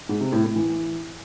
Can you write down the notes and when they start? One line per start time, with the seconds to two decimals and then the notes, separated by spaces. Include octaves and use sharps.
0.09 G#2
0.21 C3
0.32 A2
0.44 A2
0.56 E3